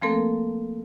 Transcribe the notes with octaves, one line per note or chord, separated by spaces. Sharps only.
F3 A3 A#3 C4 A4 A#4